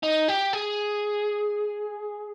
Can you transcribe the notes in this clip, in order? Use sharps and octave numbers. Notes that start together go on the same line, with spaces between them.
D#4
G4
G#4